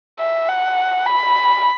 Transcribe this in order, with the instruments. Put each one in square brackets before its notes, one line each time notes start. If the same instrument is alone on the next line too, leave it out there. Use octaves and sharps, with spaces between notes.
[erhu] E5
F#5
B5